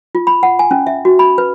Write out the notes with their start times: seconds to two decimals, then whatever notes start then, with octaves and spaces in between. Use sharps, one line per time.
0.15 F4
0.27 B5
0.43 F#5
0.59 G#5
0.71 C#4
0.87 E5
1.05 F#4
1.19 B5
1.38 B4